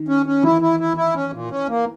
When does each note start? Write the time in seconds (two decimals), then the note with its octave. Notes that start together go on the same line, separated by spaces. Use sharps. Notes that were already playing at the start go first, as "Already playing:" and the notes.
Already playing: D#3
0.08 C#4
0.26 C#4
0.43 E3 E4
0.62 E4
0.80 E4
0.97 E4
1.15 C#4
1.33 A#2
1.51 C#4
1.69 A#3